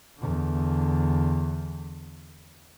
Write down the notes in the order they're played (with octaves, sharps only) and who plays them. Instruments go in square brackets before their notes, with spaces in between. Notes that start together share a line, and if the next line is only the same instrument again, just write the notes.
[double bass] E2 D3